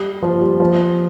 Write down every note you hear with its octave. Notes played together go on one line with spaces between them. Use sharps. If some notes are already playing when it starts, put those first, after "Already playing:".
Already playing: G3
F3
G3
F3